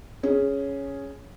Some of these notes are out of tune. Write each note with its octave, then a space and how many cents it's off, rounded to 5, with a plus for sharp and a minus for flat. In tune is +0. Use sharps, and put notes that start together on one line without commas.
C#4 +0 G#4 +0